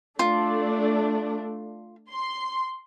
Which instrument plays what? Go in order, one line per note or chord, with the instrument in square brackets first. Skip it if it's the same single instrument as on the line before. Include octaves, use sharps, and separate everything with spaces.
[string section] A3 D4 [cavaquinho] F4
[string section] C6